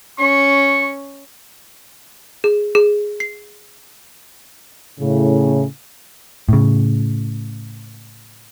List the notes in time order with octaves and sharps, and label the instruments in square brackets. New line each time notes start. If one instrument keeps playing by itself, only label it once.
[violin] C#4 [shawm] C#6
[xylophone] G#4
G#4
C7
[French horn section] A2 C#3
[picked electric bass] A2 C#3